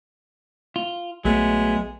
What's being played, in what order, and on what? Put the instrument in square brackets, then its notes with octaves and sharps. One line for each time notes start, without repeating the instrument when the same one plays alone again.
[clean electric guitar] F4
[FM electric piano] A#1 [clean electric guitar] F#3 A3 B3 [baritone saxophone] G#3